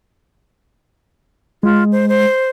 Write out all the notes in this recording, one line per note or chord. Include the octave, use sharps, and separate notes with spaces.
G#3 F4
C5
C5